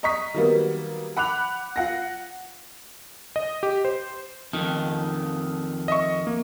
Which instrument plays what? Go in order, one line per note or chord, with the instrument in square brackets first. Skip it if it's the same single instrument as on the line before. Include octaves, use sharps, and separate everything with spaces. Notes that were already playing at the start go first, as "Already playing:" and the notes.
[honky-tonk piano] D#5 A#5 C#6 D#6 B6
D#3 F#3 G3 A#3 B3
F#5 B5 D6 F#6 F7
F4 F#5 A#6
[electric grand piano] D#5
G4
C5
[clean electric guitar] F2 D#3
[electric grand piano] D#5 E5 C#6
A#3